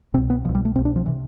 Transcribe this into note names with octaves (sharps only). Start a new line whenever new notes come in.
C2 B2 C4
B3
C2 B2 F3
G3
A3
C2 B2 C4
D4
F3
C3 E3